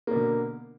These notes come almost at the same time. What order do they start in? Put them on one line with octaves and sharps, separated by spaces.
A#3 B2 D3